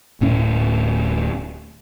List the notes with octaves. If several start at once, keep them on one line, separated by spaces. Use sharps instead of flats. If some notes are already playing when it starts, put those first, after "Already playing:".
D1 A2 C#4